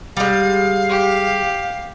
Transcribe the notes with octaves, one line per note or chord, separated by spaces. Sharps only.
G3 G#3 F5
G4